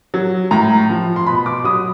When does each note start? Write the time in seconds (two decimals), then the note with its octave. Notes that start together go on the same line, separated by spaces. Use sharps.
0.14 F#3
0.51 A2 A#5
0.90 F3
1.16 C6
1.26 B2 B5
1.46 D6
1.64 F#3 D#6